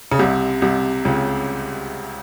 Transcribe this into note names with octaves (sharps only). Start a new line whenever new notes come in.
C#3
C2 C3
C2 C3
C#2 C#3